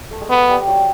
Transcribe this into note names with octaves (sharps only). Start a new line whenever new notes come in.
A3
G#3
A3 B3
G3
F#3